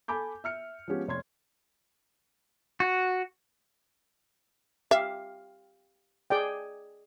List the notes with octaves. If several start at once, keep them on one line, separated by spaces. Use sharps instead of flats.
A4 G#5 B5 D6 G6
E5 F6 C#7
F3 G#3 B3 C#4 G4
F1 C#5 C6 G#6
F#4
G4 E5 F5
G#4 D5 G5